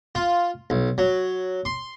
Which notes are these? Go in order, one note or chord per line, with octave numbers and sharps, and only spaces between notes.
F4
B1
F#3
C6